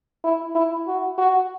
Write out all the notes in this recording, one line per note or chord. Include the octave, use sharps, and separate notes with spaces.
E4
E4
F#4
F#4